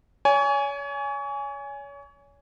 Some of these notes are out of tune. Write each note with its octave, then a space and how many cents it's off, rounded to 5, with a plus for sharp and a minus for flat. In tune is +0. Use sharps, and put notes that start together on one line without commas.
C#5 +35 G#5 +0